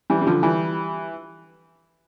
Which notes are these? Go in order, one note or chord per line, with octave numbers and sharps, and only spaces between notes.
E3 G3
G3
D3 F3
E3 G3